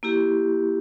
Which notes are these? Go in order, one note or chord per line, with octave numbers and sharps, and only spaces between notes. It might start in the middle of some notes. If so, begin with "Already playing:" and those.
A#3 E4 G4